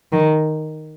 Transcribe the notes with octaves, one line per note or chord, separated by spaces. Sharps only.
D#3